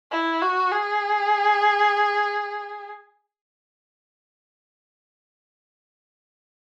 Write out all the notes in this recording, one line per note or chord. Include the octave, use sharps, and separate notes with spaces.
E4
F#4
G#4